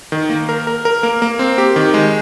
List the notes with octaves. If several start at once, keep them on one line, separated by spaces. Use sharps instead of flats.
D#3
A#3
A#4
A#4
A#4
A#3
A#3
C4
G4
D#3
G#3